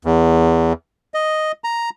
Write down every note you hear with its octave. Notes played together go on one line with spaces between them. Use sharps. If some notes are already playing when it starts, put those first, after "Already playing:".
E2
D#5
A#5